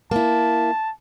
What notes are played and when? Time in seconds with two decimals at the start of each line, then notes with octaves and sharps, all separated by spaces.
0.11 A#3 E4 A5